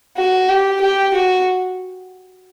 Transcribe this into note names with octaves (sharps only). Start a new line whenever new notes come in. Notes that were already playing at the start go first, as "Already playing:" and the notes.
F#4
G4
G4
F#4